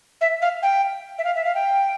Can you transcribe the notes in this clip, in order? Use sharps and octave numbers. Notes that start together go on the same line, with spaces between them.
E5
F5
G5
E5
F5
E5
F5
G5